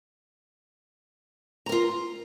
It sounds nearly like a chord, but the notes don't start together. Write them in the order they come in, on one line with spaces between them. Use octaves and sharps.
A#5 A#4 F4